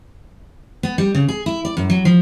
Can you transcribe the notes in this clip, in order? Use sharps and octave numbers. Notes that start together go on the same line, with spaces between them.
B3
G3
C#3
G#4
E4
D5
F#2
F#3
F3